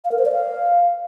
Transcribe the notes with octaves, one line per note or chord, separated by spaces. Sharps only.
F5
A#4
C5
D5
F5